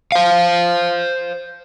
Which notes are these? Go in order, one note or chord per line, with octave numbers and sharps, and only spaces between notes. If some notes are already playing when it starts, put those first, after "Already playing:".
C5 F5